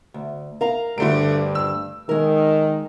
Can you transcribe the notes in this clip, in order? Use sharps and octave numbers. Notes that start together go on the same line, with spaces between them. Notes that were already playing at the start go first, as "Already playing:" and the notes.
D2
A#4 F5 A#5
D2 G2 D3 A3 D7
E6
D#3 G#3 A#4